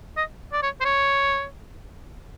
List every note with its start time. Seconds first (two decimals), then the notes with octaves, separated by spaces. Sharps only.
0.17 D#5
0.53 D5
0.62 C#5
0.81 C5
0.85 C#5